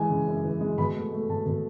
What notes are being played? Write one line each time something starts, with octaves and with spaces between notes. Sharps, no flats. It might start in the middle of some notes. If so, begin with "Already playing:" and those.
Already playing: E3 G#3 G#5
C#3
F#2
E3
G#3
B2 B5
A3
A3
B2 A5
B2